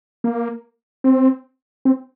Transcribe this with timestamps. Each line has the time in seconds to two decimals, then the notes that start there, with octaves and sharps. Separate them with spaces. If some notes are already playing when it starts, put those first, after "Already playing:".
0.24 A#3
1.04 C4
1.85 C4